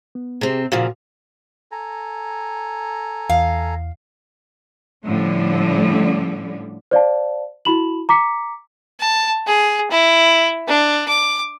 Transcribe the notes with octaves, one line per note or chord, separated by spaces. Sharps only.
B3
C3 C4 G4 G#4
A#2 C#3 F3 F#4 F5
A4 G#5 A#5
E2 F5
A2 D3 F3 G3 C#4
C5 D5 F5 A5
E4 F#4 B5 E7 F#7
A#5 D6 B6 C#7
A5
G#4
E4
D4
D6